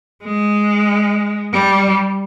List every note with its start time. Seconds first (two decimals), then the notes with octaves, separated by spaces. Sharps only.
0.24 G#3
1.53 G3